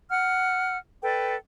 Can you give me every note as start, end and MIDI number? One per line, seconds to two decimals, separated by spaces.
0.09 0.76 78
0.09 0.76 89
1.02 1.35 69
1.02 1.35 71
1.02 1.35 74
1.02 1.35 79